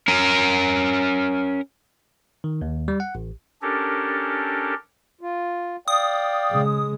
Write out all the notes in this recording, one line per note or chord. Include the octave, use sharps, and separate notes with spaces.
C#4 A#4
D#3
D#2
G3
F#5
A1
C#4 D4 G4 A4 A#4
F4
D5 F5 G5 D#6
C#3 G#3